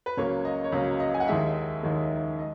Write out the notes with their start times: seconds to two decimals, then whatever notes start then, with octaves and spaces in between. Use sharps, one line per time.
0.06 B4
0.17 C#2 C#3 F#3 A#3 C#5
0.45 D#5
0.64 C#5
0.72 C#2 C#3 F#3 A#3 D#5
1.00 D#5
1.14 G#5
1.20 F#5
1.28 D#2 D#3 G#3 D#4 E5
1.83 D#2 D#3 G#3 D#4
2.39 D#5